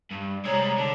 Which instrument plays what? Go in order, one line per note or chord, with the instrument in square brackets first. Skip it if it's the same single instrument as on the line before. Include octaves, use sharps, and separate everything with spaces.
[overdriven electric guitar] G2
[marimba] C3 C#5 G#6 [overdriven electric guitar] G3 G#3 [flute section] A#5
[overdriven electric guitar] D3 [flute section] A5